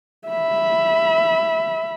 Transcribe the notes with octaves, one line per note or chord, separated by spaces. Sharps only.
E5 B5